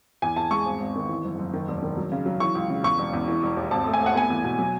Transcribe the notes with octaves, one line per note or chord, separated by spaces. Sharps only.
E2 G#5
E2 A5
G#3 C#6
G#1
G#1
D#3
E3
F#1
F#1
D#3
E1
D#3
F#3
C#3
F#3
E3 C#6
C#2
C#3
E2 C#6
E1
E2
E3
E1
D#2
G#1 A5
A3
G#5
A3
F#5
B3 G#5
E2
B2
F#3